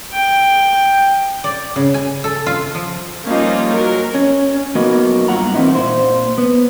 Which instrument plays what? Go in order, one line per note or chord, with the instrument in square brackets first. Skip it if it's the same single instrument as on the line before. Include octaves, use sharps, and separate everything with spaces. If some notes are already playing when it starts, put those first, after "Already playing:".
[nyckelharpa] G5
[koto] D5
C#3
G#5
A4
F4
F3
[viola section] F3 G3 A#3 C#4 D#4 F4
F#3 A#4
[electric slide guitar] C#4
F#3 A#3 B3 D#4 F#4
G2 B2 F4 F#5 A#5
E3 A#3 C4 D#4 E4
A#2 C5
B3